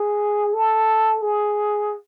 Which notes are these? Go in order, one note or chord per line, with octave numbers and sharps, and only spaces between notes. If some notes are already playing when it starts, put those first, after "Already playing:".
Already playing: G#4
A4
G#4